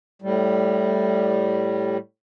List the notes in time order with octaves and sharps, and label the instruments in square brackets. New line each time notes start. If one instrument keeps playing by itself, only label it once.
[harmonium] A2 G3